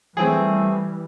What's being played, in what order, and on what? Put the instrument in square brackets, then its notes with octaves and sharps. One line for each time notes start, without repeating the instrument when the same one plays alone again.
[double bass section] E3 G3 [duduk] A3 [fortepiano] C4 G#4